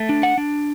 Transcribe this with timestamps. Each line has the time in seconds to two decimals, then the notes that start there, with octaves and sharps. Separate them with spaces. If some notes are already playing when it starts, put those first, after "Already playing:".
Already playing: A3
0.09 D4
0.23 F#5
0.38 D4